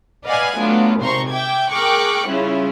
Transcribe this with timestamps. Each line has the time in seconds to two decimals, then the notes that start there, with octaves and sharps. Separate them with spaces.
0.25 B4 D5 D#5 F5 F#5 G#5
0.56 F#3 A3 B3 D4 F4
1.00 G#1 C3 C5 A#5 C6 C#6
1.30 E5 G5 D6 G#6
1.72 G#4 A#4 G5 C#6 D6 F#6
2.29 C#3 G3 C#4 E4 F4